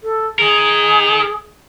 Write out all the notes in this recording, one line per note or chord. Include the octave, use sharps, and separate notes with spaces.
A4
D#4 G#4 A#4